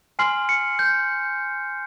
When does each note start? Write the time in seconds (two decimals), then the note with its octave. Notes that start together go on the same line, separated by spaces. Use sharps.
0.19 G#5 C6 F6 C7
0.49 C#7
0.79 G6